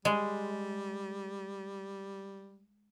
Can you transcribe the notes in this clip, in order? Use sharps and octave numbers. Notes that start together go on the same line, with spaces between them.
G3 G#3